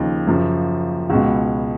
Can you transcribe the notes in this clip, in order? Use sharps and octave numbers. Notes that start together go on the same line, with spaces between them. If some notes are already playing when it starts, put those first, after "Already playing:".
Already playing: D#2 C#3 F3 D#4
F#2 C#3 F3
C#2 B2 F#4